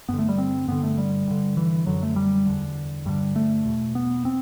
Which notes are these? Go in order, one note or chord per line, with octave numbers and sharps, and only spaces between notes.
G2 D3 B3
A3
G3
C4
G2 D3 B3
A3
G3
G2 D3
E3
F#2 D3 F#3
A3
G3
E2 D3
G2 D3 G3
A3
E2 B2
B3
C4